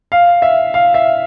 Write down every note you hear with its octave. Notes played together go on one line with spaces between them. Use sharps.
F5
E5
F5
E5